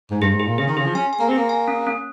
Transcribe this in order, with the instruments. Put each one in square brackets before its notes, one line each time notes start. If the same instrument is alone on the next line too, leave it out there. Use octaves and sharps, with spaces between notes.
[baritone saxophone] G#2
[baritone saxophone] G2 [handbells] G#4
[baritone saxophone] G#2
[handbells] G#4
[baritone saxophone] A#2
[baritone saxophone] C#3 [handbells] G#4
[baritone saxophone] D#3
[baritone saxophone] C#3 [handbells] G#4
[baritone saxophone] F3
[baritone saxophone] C#4 [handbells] G#5
[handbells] G#5
[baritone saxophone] A#3
[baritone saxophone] C4 [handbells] G#4
[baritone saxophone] A#3
[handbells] G#5
C#4
C#4